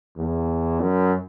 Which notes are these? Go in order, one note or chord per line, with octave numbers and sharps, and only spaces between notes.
E2
F#2